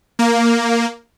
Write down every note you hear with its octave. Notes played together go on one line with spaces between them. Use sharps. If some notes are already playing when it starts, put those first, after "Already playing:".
A#3